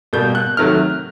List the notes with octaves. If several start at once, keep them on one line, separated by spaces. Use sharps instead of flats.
B2 G3 A#3 G6
F#6
C3 D#3 F#3 A3 F6